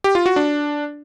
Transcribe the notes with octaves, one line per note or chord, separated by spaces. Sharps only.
G4
F4
F#4
D4